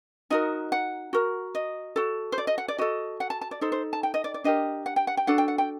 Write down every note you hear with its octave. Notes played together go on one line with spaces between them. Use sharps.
D#4 F#4 A#4 D#5
F#5
F#4 A#4
D#5
F#4 A4
C5
D5
D#5
F#5
D5
F#4 A4 D#5
F#5
A5
A5
D5
D#4 A4 C5
C5
A5
G5
D#5
D5
D5
D4 G4 A#4 D#5
F#5
G5
F#5
G5
D4 F#4 A4 F#5
G5
F#5
G5